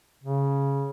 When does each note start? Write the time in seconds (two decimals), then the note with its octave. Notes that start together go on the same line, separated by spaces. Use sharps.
0.24 C#3